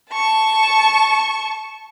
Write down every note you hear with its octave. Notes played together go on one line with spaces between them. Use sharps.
A5 C#6